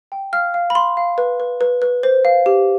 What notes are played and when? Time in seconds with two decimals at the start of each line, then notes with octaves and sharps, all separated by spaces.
0.12 G5
0.33 F5 F6
0.54 F5
0.70 B5
0.75 F5 C6
0.97 F5
1.18 B4
1.40 B4
1.61 B4
1.82 B4
2.03 C5
2.25 F5
2.46 G4